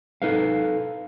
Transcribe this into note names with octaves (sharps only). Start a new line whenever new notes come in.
D#4 A4 B4 F5